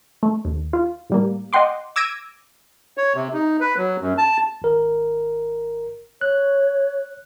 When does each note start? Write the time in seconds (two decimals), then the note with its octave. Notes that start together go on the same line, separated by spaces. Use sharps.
0.23 A3
0.45 D#2
0.73 F4
1.10 A2 G3 A#3
1.53 D#5 F#5 G5 C6 D6
1.96 D6 E6 G#6 A#6 D7 D#7
2.98 C#5
3.14 C3
3.34 D#4
3.61 B4
3.77 F#3
4.01 F#2
4.18 A5
4.62 G#1 A#4
6.21 C#5 F#6